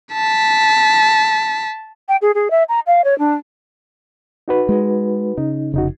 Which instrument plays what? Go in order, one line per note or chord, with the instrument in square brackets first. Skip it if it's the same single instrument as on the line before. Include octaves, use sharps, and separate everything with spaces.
[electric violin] A5 B6
[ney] G5
G#4
G#4
E5
A#5
F5
C#5
D4
[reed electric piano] D#4 F#4 B4
[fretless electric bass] G#3
[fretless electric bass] C#3 [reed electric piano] D#4
[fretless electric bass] F1 [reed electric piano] C#3 D#4 F#4